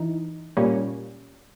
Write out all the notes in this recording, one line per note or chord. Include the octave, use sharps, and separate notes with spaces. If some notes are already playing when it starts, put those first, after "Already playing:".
Already playing: E3 D#4
A#2 G3 A#3 C#4